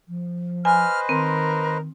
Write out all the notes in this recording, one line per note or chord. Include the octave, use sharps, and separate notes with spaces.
F3
B4 C5 D#5 G#5 F6
D#3 C4 A#4